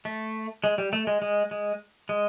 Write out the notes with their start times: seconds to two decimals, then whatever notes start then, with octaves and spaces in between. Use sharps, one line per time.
0.05 A3
0.64 G#3
0.78 G3
0.93 A3
1.07 G#3
1.22 G#3
1.51 G#3
2.09 G#3